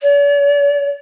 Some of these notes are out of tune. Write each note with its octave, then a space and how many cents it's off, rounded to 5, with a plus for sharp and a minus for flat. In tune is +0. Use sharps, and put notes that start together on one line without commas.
D5 -45